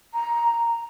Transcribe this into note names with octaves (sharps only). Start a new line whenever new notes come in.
A#5